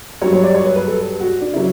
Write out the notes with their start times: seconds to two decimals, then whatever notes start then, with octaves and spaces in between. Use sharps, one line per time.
0.21 G2 F#3 C#5
0.33 C#5
0.44 D5
0.54 C#5
0.65 B4
0.76 B4
0.87 A4
1.20 F#4
1.41 D4
1.53 C#3 F#3 E4